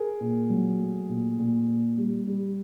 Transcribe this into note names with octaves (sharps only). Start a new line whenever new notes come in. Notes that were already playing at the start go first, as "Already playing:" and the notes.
Already playing: G#4 A#4
A#2
F#3
A3
A#2
A#2
A#2
G3
G3